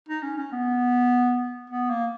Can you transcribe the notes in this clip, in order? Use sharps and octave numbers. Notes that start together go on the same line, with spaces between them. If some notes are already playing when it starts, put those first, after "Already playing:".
D#4
C#4
C#4
B3
B3
A#3